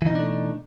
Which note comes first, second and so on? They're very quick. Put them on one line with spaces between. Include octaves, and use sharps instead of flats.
E3 D#4 B2 D4 A3